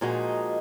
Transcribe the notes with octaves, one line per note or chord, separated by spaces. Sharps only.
A#2 F3 G#3 D#4 F#4